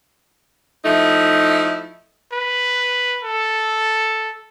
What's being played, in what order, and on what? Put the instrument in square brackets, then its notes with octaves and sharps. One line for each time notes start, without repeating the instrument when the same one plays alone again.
[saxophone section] F3 A3 D#4 E4
[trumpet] B4
A4